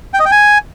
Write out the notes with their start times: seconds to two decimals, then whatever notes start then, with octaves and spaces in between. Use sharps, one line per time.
0.14 G5
0.20 D#5
0.25 G5
0.31 G#5